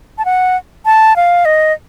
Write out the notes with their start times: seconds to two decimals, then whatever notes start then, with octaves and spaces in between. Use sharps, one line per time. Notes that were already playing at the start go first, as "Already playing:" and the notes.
0.18 A5
0.25 F#5
0.85 A5
1.16 F5
1.45 D#5